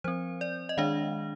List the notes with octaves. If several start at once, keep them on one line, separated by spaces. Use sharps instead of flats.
F3 C4 C5
D5
D#5
D#3 G#3 D4 F5